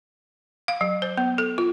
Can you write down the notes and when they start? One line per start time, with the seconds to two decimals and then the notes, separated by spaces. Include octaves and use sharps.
0.68 F5
0.81 F#3
1.02 C5
1.17 B3
1.38 A4
1.58 F4